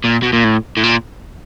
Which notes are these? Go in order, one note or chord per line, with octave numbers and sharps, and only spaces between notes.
A#2
B2
A#2
A2
A2
A#2